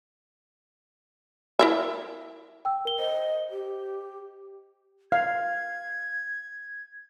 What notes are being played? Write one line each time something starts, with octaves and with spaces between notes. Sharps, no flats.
E4 A#4 E5
G5 E6
A#4 G7
C5 D#5
G4
F5 G#6